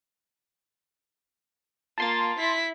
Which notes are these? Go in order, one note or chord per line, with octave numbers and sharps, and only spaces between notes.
A#3 F4 A5 C6 A6
E4 B6